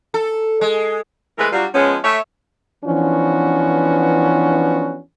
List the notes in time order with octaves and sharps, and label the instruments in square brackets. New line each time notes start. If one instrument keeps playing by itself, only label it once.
[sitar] A4
G#3
[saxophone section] E3 G#3 A3 A#4 B4
F#3 G3 D4 F4 F#4
F3 G#3 B3 C#4
A3 C#5 E5
[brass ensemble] E3 F3 B3 C#4 D4 F#4